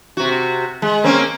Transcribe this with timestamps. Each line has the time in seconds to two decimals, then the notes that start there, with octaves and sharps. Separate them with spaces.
0.17 C3 F#4
0.82 G#3
1.04 A#3 C4 C#4